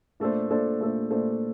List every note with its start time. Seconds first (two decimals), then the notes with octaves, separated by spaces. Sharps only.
0.20 A#2 A3 D4 A4 C5
0.50 A#2 A3 D4 A4 C5
0.80 A#2 A3 D4 A4 C5
1.11 A#2 A3 D4 A4 C5